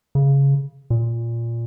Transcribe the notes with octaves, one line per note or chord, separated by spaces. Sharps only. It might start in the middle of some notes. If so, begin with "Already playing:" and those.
C#3
A#2